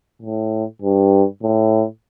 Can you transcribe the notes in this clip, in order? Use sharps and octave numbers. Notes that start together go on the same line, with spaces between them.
A2
G2
A2